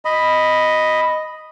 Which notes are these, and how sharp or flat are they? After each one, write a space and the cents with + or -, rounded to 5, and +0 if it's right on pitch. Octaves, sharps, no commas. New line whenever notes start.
D#5 +0 B5 +0